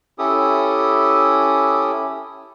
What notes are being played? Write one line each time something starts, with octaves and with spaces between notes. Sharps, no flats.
C#4 E4 G4 A4 D#6